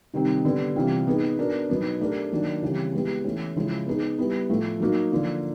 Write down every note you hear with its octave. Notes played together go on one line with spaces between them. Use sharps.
C3 D#3 G3 C4 D#4
D3 G3 B3
C3 E3 G3 C4 F4
B3 D#4 G#4
B3 D4 F#4 A#4
B2 F#3 B3 D#4
A3 D4 G4 A#4
D#3 F#3 A#3 D4
C#3 E3 G3 C4
G#3 B3 E4 G4
E3 A3 C#4
C#3 F3 G#3 C#4 E4
B3 D#4 G#4
G3 B3 E4
A2 F3 A3
F#3 A#3 D#4 F#4
D3 F3 A#3